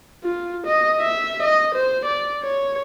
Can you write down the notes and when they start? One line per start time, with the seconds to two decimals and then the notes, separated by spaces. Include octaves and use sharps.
0.24 F4
0.66 D#5
1.01 E5
1.42 D#5
1.75 C5
2.05 D5
2.43 C#5